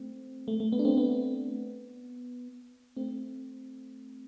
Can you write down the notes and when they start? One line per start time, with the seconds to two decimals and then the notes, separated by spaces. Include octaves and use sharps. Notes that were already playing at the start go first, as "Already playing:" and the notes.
Already playing: A3 C4
0.48 A3
0.60 A3
0.72 B3
0.79 D4
0.85 A3 C4
0.98 B3
2.97 A3 C4